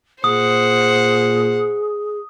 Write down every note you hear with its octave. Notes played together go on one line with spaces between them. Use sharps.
A#2 G#4 C5 F#5 D#6